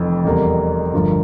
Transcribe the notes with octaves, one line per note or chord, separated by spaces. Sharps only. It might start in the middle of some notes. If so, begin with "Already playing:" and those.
Already playing: F1 F2 E3
F1 E2 C3 G3 A#3
G1 G2 F3 A#3 F4